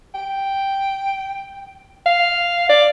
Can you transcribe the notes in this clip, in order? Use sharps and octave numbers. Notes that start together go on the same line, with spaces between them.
G5
F5
D5